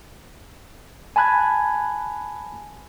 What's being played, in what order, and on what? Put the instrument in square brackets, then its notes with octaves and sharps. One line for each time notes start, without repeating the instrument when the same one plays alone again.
[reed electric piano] G#5 A5 B5 F#6 G#6